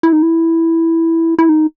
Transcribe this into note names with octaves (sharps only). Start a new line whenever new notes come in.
E4
D#4
E4
E4
D#4